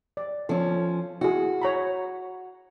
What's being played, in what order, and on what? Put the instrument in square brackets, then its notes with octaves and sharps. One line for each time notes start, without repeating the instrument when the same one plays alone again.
[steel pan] D5
[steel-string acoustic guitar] F3 C#4 [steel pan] A4
[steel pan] E4 G#4 [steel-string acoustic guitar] F#4
[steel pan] C#5 A#5 B5